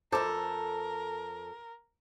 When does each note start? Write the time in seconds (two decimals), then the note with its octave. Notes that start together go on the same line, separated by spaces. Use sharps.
0.12 F2 A4 A#4 C5 A5 D6